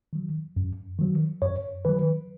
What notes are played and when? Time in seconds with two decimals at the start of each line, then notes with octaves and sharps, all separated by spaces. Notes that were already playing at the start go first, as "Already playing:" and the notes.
0.13 D#3 F#3
0.57 F#2
0.99 D#3 F#3
1.42 F#2 C#5
1.85 D#3 F#3 B4